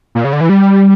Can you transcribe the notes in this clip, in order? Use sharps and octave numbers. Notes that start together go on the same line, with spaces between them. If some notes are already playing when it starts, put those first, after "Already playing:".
A#2
C#3
D3
E3
G3